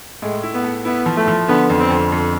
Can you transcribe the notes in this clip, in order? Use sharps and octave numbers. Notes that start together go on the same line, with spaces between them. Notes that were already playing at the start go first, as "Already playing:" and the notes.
A2 G#3
E4
B3
A3
B3 E4
F3
A3
F3
D3 B3
F2
C4
F2
F2